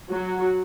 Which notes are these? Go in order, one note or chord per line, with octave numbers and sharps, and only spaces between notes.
F#3 F#4